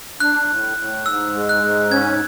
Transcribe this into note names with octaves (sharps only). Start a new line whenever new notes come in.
D4 F#6
A2
A2
G#2 E6
G#3
F#6
G#2
C#4 G#6